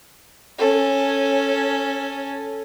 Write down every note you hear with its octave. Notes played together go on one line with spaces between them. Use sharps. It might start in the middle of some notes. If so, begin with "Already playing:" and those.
C#4 A4